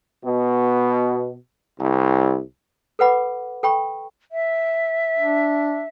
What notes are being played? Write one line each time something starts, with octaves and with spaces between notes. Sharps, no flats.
B2
C2
A4 B4 F#5 B5 D6
A4 G5 B5 C#6
E5
D4